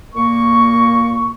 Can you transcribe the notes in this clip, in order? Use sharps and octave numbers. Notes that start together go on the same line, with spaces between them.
A#2 A#3 C#6